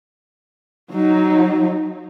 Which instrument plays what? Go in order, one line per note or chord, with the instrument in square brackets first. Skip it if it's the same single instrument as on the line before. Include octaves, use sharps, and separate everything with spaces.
[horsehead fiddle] F#3 D#4